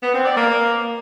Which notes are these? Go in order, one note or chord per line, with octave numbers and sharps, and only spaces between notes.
B3
C4
D5
A#3